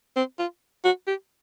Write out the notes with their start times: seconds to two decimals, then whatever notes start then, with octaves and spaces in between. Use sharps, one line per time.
0.16 C4
0.39 F4
0.85 F#4
1.07 G4